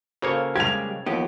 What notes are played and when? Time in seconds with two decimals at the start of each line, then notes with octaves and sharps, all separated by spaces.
0.22 C#3 A#3 F#4 A4 C5 C#5
0.56 G3 G#3 G4 G#6 F7
1.06 D#2 E3 F3 B3 G4